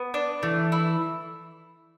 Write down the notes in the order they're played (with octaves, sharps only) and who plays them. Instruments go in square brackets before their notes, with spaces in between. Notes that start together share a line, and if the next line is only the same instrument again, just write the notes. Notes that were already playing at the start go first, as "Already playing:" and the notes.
Already playing: [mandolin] B3
D4
[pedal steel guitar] E3 [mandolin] A3
[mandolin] E4